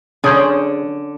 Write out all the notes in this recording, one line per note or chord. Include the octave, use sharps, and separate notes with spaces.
D3 C#4 G#4 C5